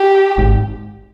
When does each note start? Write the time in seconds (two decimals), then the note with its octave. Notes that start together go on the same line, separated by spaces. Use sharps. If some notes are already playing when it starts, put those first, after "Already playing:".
Already playing: G4
0.38 G#1 G#2